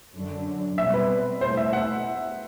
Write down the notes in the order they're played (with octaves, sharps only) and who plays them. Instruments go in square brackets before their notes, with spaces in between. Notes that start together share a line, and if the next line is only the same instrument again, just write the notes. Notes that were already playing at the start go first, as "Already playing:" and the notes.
[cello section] F#2 D3 F#3
[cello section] B2 [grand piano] E5
[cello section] G3 C4
[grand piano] B4
[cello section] B2 A3 E4 [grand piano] C5
[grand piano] E5
F#5